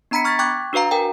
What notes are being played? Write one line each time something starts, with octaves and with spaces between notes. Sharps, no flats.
B3 D4 A#5 B5 B6 C#7
C#6 F6 G#6 A6 B6
G5 C#6 D6 F#6 G#6
D4 F#4 B4 F5 A#5
A#4 G5 G#5